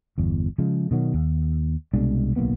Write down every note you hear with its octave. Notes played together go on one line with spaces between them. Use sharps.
G1 E2
C#3 F3 G#3
B2 D#3 F#3
D#2
C2 B2 G#3 D4
D1 B1 A#3 B3